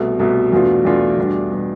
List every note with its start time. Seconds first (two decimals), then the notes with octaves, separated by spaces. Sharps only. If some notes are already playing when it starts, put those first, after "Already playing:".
Already playing: C2 B2 A3
0.19 C2 B2 A3
0.52 E2 B2 A3 D4 F4
0.85 E2 B2 A3 D4 F4
1.18 E2 B2 G3 D4
1.52 B2 G3 D4